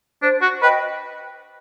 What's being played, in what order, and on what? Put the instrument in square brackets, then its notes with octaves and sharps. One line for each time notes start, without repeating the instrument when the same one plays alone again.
[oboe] D4 [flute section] C5
[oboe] F#4
[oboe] B4 [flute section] D#5 G5